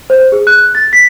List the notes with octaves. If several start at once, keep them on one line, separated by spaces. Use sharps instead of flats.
C5
G#4
F#6
A6
B6